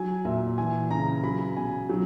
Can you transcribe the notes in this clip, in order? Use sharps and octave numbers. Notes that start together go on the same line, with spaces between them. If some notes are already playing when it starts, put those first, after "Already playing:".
Already playing: F#3 G#5
A#2 E5
E3 G#5
C#3 A#5
F#3 B5
B2 G#5
F#3